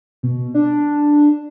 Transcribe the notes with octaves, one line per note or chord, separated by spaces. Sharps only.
B2
D4